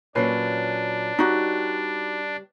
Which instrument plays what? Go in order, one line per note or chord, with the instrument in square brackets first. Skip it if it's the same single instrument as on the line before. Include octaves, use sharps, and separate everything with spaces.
[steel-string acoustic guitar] A#2 F#3 [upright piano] C#4 B4 C7 [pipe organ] D4
[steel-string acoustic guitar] G3 G4 [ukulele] D#4 F#4